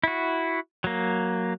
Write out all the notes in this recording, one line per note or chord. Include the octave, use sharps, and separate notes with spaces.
E4 F#4
F#3 A#3